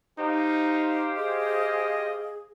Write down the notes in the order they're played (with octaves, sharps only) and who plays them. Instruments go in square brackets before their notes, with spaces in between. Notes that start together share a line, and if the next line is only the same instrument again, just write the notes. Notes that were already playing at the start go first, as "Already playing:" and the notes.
[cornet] D#4 [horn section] G4 C5 F5
[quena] G#4 [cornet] D#5